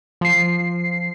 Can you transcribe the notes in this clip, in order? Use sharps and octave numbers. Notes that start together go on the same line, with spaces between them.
F3 C7